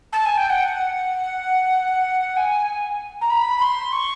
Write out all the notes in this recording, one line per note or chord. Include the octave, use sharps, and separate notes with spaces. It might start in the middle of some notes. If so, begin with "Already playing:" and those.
A5
G#5
G5
F#5
G#5
A#5
B5
C6
C#6